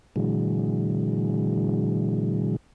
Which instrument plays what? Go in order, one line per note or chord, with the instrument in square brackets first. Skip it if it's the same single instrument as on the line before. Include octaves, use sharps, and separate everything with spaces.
[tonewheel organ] A#2 D3 E3 F#3 G#3